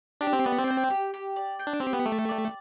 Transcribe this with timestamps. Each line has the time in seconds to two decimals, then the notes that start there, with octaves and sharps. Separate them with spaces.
0.21 D4 G4
0.33 C4
0.44 B3 D5
0.58 C4
0.67 G5
0.90 G4
1.14 G4
1.36 D5
1.59 G5
1.67 D4
1.80 C4 G4
1.93 B3
2.06 A3 G4
2.29 D5